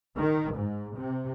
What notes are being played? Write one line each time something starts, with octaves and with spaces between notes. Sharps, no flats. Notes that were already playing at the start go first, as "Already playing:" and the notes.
D#3
G#2
C3